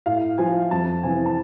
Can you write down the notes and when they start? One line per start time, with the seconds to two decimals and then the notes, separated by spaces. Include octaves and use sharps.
0.06 A2 F5
0.38 F3 G#5
0.71 F2 A5
1.03 C3 E3 G#5
1.26 A5